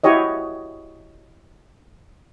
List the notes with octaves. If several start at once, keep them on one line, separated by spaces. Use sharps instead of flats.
E4 F#4 G4 C#5 D#5